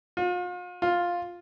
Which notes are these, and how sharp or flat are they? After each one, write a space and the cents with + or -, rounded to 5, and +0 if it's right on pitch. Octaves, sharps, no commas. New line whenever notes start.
F4 +40
F4 +5